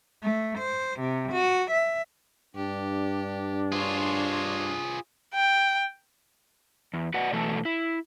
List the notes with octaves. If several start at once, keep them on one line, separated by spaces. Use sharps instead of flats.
A3
C5
C3
F#4
E5
G2 D4 G4
F4 G#4 C5 C#5
G5
E2
F#4 B4 D5 F#5
B2 E3 F#3 A3 A4
E4